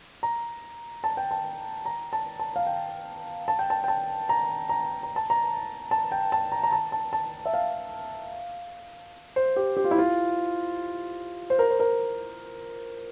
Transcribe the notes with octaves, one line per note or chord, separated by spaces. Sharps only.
A#5
A5
G5
A5
A#5
A5
A5
F5
G5
A5
G5
A5
G5
A5
A#5
A#5
A#5
A5
A#5
A5
G5
A5
A#5
A#5
A5
A5
A5
E5
F5
C5
G4
G4
F4
E4
F4
C5
A#4
C5
A#4